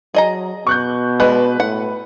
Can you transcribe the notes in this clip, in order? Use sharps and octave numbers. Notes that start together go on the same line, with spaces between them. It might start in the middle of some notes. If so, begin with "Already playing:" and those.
F#3 G#4 D#5 A#5
B2 C#6 F#6 G6
G#3 D4 B4 F#6
A2 F#5